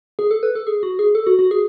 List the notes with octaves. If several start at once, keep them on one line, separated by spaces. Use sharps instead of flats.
G#4
A4
B4
A4
G#4
F#4
G#4
A4
F#4
F#4
G#4